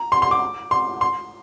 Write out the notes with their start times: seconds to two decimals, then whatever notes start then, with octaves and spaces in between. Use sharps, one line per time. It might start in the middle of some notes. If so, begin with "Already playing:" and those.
Already playing: A#5
0.12 C6
0.22 C6
0.31 D6
0.71 C6
1.01 C6